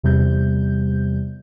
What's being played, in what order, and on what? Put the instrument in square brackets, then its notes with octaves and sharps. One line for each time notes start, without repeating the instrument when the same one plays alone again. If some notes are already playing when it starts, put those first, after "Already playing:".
[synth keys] E2 C3 G3 G6